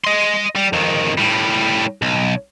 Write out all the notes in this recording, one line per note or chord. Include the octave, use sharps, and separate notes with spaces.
D#5 C6
G3
F2 D#3
A2 G3
B1